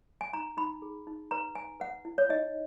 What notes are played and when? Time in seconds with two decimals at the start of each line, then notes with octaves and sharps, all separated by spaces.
0.21 G#5
0.33 D#4 A#5
0.57 D#4 B5
0.82 G#4
1.07 D#4
1.31 B4 A#5
1.55 B4 G#5
1.80 B4 F#5
2.05 E4
2.18 C#5
2.29 D#4 D#5